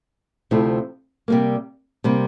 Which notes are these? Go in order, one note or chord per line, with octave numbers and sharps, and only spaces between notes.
D2 C3 F3 A3 E4
C3 G3 A#3
C3 G3 A#3